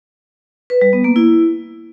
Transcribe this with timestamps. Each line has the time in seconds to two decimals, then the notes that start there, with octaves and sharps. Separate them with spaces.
0.70 B4
0.81 G3
0.93 B3
1.04 A#3
1.16 E4